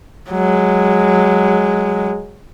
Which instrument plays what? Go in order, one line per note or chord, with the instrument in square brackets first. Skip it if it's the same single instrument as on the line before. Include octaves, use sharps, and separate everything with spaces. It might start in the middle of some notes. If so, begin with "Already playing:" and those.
[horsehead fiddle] F#3 G#3